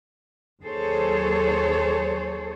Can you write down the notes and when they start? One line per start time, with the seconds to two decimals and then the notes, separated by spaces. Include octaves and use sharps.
0.63 D#2 F#3 G#4 A4 C5 C#5